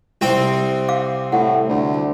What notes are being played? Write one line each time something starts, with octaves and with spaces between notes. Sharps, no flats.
C2 C4 G5
F5 D6
A2 F#5
D2